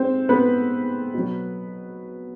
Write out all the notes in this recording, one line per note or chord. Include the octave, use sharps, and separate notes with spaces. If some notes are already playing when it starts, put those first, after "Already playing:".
Already playing: G#3 C4 C5
B3 B4
B2 F#3